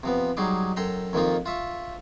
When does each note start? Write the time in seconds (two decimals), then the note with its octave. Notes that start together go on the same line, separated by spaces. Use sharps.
0.03 C3 F3 B3
0.37 F#3 G3 D#4 G#4 C6 D6
0.76 F#2 A4 G5 A#5 C6
1.13 F2 D#3 F3 A#3 D#4 F4
1.46 F4 E5 C#6